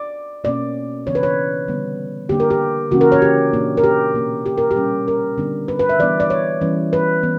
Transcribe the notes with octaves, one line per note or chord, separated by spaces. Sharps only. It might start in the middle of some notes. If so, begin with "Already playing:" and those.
Already playing: D5
B2 A#3 C#4 D5
C#3 E3 B3 D4 C#5
B4
C#5
D3 G3 B3 D4
D3 A#3 D4 G4
A#4
G4
C#3 E3 A#3 C#4 F#4
A#4
C#5
G4
A#2 A#3 D4
A#4
G4
B2 A#3 C#4
G4
A#4
G4
A#2 G3 C#4
A#4
D3 G3 B3 D4
B4
B4
E5
E3 G3 B3 D4 D5
D5
C#5
E3 G3 C#4
B4
E3 B3